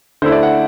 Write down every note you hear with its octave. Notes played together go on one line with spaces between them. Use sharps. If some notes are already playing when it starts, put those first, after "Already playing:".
D3 A3 E4 C5
D5
F#5